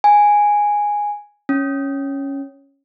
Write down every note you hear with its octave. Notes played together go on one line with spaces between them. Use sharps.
G#5
C#4